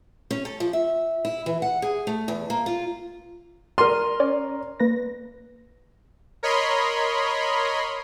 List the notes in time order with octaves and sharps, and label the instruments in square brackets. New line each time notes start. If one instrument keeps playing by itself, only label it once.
[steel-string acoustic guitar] C#4
A4
F3
E5
E4
E3
F#5
G#4
A3
E2
A#3
F4
[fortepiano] A#4 C6 [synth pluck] D5 F6 D#7
[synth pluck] C#4 C#5 D5
A#3 B4 A#6
[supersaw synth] A#4 C#5 D#5 B5 C6